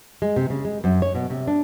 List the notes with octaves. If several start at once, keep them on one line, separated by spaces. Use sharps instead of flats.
G#3
C3
C#3
G#3
F#2
C#5
B2
C3
D4